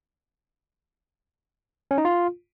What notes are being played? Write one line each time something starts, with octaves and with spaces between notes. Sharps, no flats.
C#4
D#4
F4